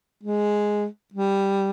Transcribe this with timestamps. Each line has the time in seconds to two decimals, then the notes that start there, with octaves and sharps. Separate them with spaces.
0.23 G#3
1.14 G3